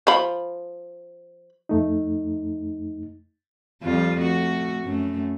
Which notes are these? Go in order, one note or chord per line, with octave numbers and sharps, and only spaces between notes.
F3 B5
F2 A3 D#4
F2 G3 F4
A3 F#4
F#2 A3